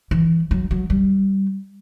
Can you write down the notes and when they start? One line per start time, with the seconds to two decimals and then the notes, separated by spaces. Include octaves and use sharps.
0.11 E3
0.51 F#3
0.71 F#3
0.90 G3